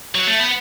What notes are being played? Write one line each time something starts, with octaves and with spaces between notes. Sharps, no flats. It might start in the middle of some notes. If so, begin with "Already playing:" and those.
F#3
A3
B3